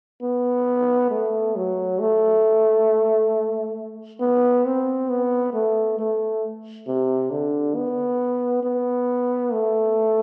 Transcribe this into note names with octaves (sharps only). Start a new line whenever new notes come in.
B3
A3
F#3
A3
B3
C4
B3
A3
A3
C3
D3
B3
B3
A3